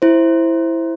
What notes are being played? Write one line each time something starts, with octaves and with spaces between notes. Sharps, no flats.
E4 C5